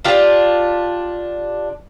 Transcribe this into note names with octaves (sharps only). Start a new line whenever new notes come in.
D4 F4 G4